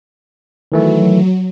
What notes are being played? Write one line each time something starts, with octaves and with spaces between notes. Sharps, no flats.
D#3 E3 F#3 A3